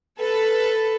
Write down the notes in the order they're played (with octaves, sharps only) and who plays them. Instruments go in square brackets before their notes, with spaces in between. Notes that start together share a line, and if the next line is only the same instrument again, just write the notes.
[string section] A4 B4